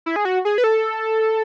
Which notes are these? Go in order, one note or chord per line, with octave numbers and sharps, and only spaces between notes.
E4
G#4
F#4
G#4
B4
A4